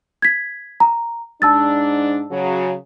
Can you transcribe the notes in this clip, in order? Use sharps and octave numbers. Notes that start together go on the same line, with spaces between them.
G#6 B6
A#5
G#2 D4 A5 E6 A6
C#3 F#3